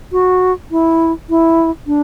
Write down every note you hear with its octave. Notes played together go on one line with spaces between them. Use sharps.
F#4
E4
E4
D4